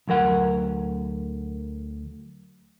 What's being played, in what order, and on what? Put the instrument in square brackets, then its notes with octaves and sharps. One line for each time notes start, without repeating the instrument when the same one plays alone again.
[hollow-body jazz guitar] D2 F#3 A#4 F#5